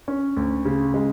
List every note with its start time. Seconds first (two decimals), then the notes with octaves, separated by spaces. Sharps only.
0.08 C#4
0.37 D2
0.65 C#3
0.94 G#3